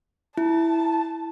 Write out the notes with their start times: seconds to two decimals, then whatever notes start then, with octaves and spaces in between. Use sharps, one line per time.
0.38 E4 A5